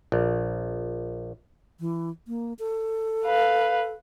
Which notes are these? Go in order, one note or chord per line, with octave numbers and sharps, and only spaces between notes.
A#1
E3
A#3
A4
B4 F5